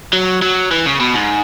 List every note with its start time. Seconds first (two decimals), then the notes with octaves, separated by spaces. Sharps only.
0.13 F#3
0.42 F#3
0.71 E3
0.86 C#3
1.00 B2
1.14 G#2